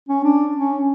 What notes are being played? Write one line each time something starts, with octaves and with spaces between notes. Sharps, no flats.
C#4
D4
C#4